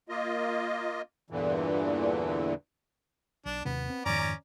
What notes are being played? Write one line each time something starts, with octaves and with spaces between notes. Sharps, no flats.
A#3 F4 D#5
E2 G2 A#2 D3 E3
B1 D4
D#2 C3 B3 C4
C4
F2 G#2 D#3 C#4 D5 A#5